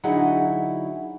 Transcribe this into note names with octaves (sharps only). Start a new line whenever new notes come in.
D3 F#3 D#4 E4 F#4 G#4